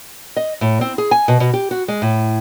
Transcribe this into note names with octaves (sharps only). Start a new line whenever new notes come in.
D#5
A2
C4
G#4
G#5
B2
B2
G4
F#4
G#3
A2